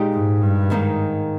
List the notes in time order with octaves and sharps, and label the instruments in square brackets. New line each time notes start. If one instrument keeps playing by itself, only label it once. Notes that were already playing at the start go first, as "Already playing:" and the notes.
Already playing: [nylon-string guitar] A#2 G#3 D#4 G4
[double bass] G#2
G2
[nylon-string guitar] G#2 D#3 A#3 D#4